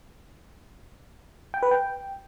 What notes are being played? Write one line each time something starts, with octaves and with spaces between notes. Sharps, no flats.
G5
B4
G5